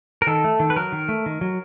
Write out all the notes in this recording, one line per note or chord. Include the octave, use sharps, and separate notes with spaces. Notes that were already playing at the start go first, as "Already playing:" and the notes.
A#4
D#3 A4
A3
D#3
B4
F#3 A#4
D#3
A3
D#3
F#3